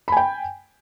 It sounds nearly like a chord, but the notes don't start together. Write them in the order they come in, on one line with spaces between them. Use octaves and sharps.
B5 G#5 G5